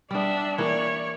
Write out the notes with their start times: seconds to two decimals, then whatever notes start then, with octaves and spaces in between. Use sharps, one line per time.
0.11 G3 B3 D4 E5
0.58 E3 A#3 C#5 D5